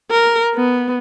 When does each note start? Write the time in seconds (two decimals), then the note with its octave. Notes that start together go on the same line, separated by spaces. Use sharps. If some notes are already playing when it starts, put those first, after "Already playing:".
0.11 A#4
0.55 B3